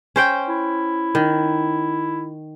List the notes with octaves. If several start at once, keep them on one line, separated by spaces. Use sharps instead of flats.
C#4 C5 G5
E4
D#3